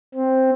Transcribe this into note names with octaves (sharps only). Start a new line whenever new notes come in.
C4